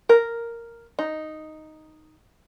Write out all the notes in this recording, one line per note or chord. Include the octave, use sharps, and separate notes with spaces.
A#4
D#4